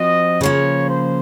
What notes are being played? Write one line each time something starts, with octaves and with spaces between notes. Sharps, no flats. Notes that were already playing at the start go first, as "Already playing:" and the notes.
Already playing: F3 C4 F#4 D#5
C#3 F3 A#3 C#5
C5